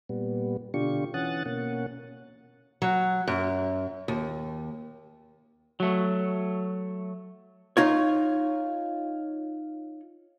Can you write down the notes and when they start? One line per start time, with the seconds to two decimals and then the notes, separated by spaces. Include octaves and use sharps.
0.09 A#2 G3 B3
0.74 B2 D3 D4 F4 G4 C#6
1.14 E3 C#4 F#5 D#6 F#6 A6
1.46 B2 A#3 C#4 F#5
2.82 F#3
3.28 F#2
4.08 D#2
5.80 F#3 A3
7.77 D#4 F4 C#5